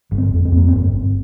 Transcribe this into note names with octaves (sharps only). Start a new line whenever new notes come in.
G1
C4
F2
C4
F2
A#3
G1 C4
G1